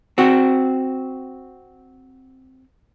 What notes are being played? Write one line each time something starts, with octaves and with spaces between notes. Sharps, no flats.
C4 F#4